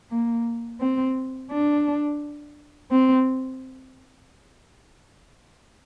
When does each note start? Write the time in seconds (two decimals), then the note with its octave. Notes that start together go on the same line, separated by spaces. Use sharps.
0.10 A#3
0.80 C4
1.51 D4
2.91 C4